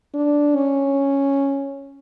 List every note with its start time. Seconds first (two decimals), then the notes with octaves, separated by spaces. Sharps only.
0.14 D4
0.55 C#4